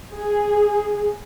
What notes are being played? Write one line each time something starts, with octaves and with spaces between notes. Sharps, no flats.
G#4